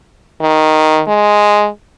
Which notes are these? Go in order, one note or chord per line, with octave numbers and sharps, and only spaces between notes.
D#3
G#3